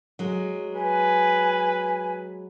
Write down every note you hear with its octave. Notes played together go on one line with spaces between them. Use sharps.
F#3 G#3
B4 G#5